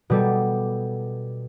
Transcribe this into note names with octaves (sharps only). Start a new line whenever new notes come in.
B2 G3 A4